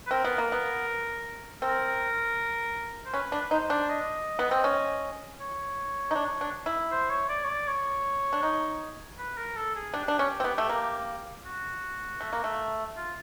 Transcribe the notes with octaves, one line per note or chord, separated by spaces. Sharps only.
B4
C4 A#4
B3
A#3
B3
C4 A#4
C5
C#4 B4
D4
D#4 C5
D4
D#5
B3
C4
C#4
C#5
D#4
D4
D4
E4
C5
C#5
D5
C#5
D5
C#5
D4
D#4
B4
A#4
A4
G#4
D4 G4
D4
C#4
C4
B3
A3
A#3
F#4
A3
A#3
A3
F4